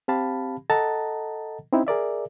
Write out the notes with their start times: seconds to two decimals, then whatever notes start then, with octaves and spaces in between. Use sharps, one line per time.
0.08 C4 G4 F5 A5 B5
0.70 A4 D#5 F#5 A5 A#5 A6
1.72 C4 C#4 D#4 E4
1.87 G#4 A#4 D5 E5